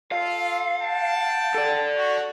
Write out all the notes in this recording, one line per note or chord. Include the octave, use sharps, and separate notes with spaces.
F4 A4 F5
F#5 G5 A5
A4 D5
F#4